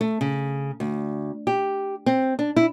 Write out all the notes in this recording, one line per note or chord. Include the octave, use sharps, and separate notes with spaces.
A3
C#3
D2
G4
C4
D4
E4